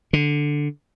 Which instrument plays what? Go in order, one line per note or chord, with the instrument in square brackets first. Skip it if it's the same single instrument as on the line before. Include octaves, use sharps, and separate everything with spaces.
[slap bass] D3